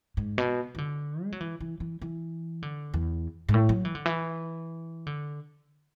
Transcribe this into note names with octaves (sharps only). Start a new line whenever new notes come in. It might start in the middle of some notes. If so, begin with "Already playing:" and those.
G#2
B2
E3
D3
G#3
F#3
E3
E3
E3
E3
D3
E2
G#2
A2
F#3
E3
D3
E3
D3